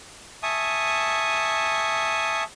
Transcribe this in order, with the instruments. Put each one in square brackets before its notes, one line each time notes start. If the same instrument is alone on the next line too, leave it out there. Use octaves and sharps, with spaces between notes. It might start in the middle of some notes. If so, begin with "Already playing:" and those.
[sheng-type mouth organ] E5 G#5 A5 C#6 D#6